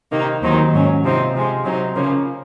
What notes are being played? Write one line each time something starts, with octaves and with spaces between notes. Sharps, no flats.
C3 D#3 A#3 D#4
D#2 D#3 F#3 C4 D#4
G#2 F#3 C#4
C3 F3 C4 D#4
C3 F3 G#3
C3 F#3 C4 D#4
C#3 F3 A#3 C#4